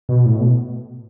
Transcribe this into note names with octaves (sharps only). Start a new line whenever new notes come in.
B2
A2
B2